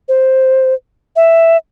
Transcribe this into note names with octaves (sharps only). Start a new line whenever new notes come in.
C5
E5